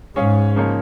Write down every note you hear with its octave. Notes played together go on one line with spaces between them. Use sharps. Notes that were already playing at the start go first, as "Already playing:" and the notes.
G#2 C#4 G#4 C#5 F5
C#3 F3 A#3 D#4 C#5